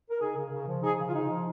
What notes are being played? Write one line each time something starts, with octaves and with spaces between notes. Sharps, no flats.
A#4
C#3 D#4 G#4
C#3
C#3
F3
F3 D#4 G#4
C#3
F4
C#3 D#4
F3